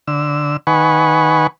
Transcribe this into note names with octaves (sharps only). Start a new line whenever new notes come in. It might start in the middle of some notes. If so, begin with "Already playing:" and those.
D3 E6
D#3 B4 F#5 G#5 C#6